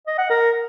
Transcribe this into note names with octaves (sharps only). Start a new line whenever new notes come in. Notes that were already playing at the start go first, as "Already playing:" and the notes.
D#5
F#5
A#4